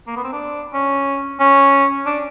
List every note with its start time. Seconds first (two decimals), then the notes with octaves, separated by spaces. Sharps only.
0.07 A#3
0.16 B3
0.24 C4
0.33 D4
0.74 C#4
1.40 C#4
2.06 D4